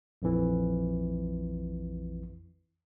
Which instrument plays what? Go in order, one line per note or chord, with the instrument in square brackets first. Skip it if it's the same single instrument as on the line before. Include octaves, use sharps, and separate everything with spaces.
[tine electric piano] A#1 F2 E3